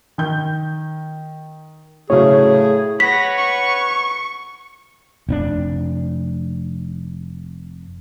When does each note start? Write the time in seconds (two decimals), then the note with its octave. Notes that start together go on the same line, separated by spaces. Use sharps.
0.18 D#3 G6
2.10 A2 C#3 F#3 G#4 C#5
3.00 B4 C#5 F#5 B5 A#6 B6
3.38 C#6
5.29 F1 C#4 D4